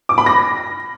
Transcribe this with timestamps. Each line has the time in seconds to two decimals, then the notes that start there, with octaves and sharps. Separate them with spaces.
0.09 D6
0.18 B5
0.26 A#6